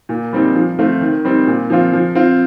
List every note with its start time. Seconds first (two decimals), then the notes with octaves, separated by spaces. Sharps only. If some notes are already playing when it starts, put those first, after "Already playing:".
0.09 A#2
0.33 G3 C4 D#4
0.55 F3
0.79 A3 C4 F4
1.01 D#3
1.25 G3 C4 D#4
1.47 A#2
1.70 F3 C4 F4
1.93 F3
2.15 C4 F4